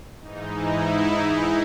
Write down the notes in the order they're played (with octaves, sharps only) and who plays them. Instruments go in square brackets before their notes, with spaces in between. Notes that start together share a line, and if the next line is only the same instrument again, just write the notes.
[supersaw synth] G#2 E3 D#4
E4
D#4